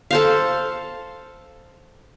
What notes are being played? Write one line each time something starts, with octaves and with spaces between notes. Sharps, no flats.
A4 C5 F5